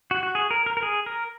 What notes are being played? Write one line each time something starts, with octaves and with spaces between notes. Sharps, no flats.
F#4
F#4
G#4
A#4
A#4
A#4
G#4
A#4